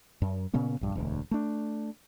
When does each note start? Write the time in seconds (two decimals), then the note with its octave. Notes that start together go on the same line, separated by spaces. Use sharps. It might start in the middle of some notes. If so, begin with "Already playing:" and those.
0.22 F#2
0.54 A#2 C#3 B3 C#4
0.81 A#1 G2
0.95 E1 D2
1.31 A3 D4